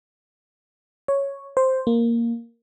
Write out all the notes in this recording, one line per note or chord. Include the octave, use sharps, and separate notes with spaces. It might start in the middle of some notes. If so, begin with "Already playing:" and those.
C#5
C5
A#3